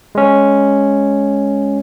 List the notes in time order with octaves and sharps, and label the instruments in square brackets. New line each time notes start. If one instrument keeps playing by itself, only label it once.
[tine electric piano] G#3 C#4